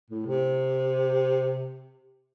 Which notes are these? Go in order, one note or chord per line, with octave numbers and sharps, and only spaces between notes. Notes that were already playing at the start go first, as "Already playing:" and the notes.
A2
C3